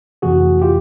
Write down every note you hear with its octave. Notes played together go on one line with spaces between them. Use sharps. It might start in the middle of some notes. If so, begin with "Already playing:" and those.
F2 C3 E3 A3 F#4 G#4
F4 G4